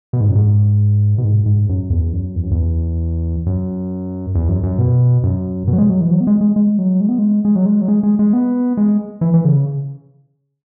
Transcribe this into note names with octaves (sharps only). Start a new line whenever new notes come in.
B2
G#2
F#2
G#2
B2
G#2
G#2
F#2
E2
F#2
E2
F#2
E2
F#2
E2
F#2
F#2
B2
F#2
B2
F#3
G#3
F#3
E3
F#3
B3
G#3
G#3
G#3
F#3
G#3
B3
G#3
G#3
F#3
G#3
F#3
G#3
G#3
G#3
B3
G#3
E3
E3
C#3